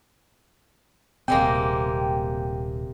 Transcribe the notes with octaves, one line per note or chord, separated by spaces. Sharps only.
D#1 C3 G#3 A#3 C4 G5